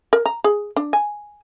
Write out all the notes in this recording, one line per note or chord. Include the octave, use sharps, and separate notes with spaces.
A#4
A#5
G#4
D4
G#5